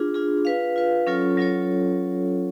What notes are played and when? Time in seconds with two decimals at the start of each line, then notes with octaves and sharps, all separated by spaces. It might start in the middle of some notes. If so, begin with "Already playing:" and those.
Already playing: D4 F4 G#4
0.14 D4 F4 G#4
0.45 F4 B4 F5
0.76 F4 B4 F5
1.07 F#3 C#4 F4 A4 C#5
1.37 F#3 C#4 F4 A4 C#5